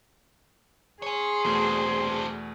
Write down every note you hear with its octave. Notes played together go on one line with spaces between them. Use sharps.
G#4 C#5 G#5 C6
E2 G2 B2 A3 C4